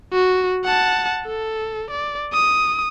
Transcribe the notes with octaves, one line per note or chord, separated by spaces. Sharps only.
F#4
F#5 A5
A4
D5
D#6